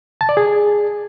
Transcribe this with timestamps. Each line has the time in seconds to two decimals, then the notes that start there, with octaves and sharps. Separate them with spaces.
0.21 A5
0.29 D5
0.37 G#4